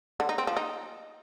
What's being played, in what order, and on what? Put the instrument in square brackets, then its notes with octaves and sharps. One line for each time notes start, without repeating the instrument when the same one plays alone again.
[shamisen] D3
D#4
C4
F3
D#4